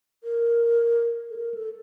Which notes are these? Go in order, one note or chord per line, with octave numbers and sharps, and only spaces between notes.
A#4
A4
A#4
A4